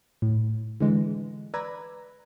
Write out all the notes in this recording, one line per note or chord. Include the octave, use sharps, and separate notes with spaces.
A2
D3 E3 G#3
B4 D5 A#5 B5 E6 G#6